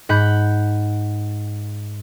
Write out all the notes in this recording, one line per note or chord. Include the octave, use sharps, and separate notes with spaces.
G#2 F#5 B5 G6